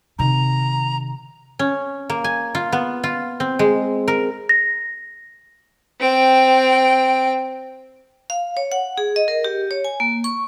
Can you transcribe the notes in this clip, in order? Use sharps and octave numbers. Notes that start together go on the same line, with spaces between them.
C3 D#3 A#5
C#4
A#3
G#5
F4
B3
F4
C4
G#3
A#4
A#6
C4 G5
F5
C#5
F#5
G#4
D#5
A#4
G4
C#5
G#5
A#3
C#6